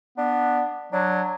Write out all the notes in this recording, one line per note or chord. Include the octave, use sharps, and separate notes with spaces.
B3 D4
F#3 D4